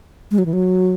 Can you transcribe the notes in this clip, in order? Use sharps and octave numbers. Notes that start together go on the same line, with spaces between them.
G#3
F#3
E3
F#3